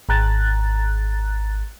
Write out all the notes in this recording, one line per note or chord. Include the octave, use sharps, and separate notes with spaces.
G#1 A#5 F#6 A6